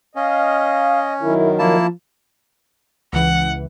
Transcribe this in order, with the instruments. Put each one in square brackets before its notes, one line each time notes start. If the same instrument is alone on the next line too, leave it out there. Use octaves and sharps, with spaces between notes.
[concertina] C#4 [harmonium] D#5 [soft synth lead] F5
[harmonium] F#2 D#3 [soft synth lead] E4
[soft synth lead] F3 [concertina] A#3 E4 A5
[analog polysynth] C#2 E3 [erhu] F#5